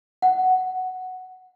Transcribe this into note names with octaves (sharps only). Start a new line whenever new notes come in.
F#5